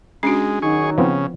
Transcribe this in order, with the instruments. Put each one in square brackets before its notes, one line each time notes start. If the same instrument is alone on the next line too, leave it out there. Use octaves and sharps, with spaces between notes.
[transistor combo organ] G#3 [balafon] C#4 D4 F#4
[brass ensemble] D#3 F#3 D#4 [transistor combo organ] G#4 C#6
[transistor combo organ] C#3 [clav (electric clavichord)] F3 B3 C4